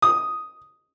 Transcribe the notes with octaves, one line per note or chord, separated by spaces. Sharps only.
D#6